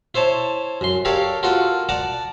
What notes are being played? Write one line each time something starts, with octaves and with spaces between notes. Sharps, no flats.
E4 C5 C#5 A5
F#2 C6
G4 A4 A#4 C#5 D5 F5
F4 F#4 A4 A#4 F#5
D5 F#5 A5 A#5